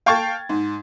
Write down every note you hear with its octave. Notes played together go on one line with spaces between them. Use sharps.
F5 G5 A5 C#6 G#6 A6
G#2